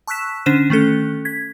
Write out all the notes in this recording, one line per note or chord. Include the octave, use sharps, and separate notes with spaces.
A5 C#6 E6 F#6 B6 E7
D3 C#4 D4 C5 D#7 E7
D#3 A3 C#4 A4 F#6
G#6 B6